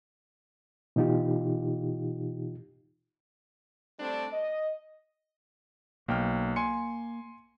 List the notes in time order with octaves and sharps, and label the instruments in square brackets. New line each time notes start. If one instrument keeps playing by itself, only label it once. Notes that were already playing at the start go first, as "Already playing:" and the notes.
[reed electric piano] B2 E3 D#4 F4 G4
[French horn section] G3 A3 C4 D4
D#5
[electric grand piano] B1 G5 F6 [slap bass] A#3
[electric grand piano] G#5 C6 C#7